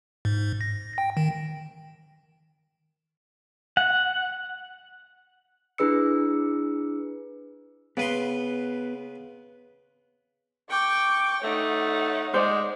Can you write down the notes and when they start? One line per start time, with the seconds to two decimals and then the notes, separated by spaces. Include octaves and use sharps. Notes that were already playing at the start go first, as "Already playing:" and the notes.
0.25 G#2
0.61 A#6
0.98 G5
1.17 D#3
3.77 F#5
5.78 D4 E4 G#4 B4 E6 C#7
7.97 C#3 B3 B4 C6
10.70 G5 C#6 D6
11.44 A3 D#4 C#5 F#5
12.34 G#3 C5 D5